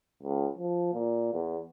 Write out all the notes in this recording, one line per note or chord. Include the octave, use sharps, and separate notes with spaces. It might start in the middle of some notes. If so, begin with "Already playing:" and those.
C#2
F3
A#2
E2